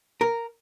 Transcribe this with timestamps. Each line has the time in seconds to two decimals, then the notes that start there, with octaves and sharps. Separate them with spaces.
0.21 A#4